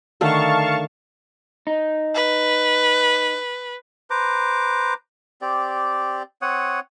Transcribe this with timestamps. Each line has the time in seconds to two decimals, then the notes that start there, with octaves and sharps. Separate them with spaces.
0.21 D3 D#3 A3 F5 A5 C#6
1.67 D#4
2.15 B4
4.10 B4 C5 A#5 D6
5.42 C4 G4 D5
6.42 C4 C#5 F#5 D#6